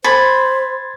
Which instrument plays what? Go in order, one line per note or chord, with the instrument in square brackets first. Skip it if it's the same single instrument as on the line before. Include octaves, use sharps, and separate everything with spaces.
[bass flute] C5 [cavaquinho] B5 [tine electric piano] C6 G#6 A6